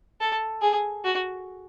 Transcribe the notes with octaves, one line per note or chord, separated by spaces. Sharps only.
A4
G#4
F#4